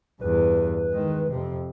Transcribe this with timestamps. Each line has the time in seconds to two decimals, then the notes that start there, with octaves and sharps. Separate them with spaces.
0.21 E2 G2 B4
0.90 D#3 G#3
1.31 F2 C3